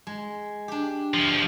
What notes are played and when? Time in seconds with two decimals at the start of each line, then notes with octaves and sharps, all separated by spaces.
0.07 G#3
0.68 D4 G4
1.14 D2 F3